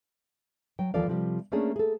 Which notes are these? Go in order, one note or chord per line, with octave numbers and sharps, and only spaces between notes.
F#3 G5
D#2 E3 F3 A4 D5 F5
C3 F3 G3
A3 A#3 C#4 D4 G#4
G#4 A4